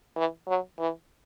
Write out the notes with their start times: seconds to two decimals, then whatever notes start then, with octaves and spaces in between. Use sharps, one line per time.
0.16 E3
0.48 F#3
0.79 E3